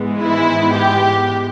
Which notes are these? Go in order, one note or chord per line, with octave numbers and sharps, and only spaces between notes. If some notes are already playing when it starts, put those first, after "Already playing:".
Already playing: G#2 E3 G#3 B3
E4
G4